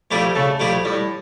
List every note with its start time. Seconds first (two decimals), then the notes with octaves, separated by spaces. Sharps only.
0.11 F3 G3 A3 E4 G4
0.35 C#3 A3
0.59 F3 G3 A3 E4 G4
0.85 A2 G3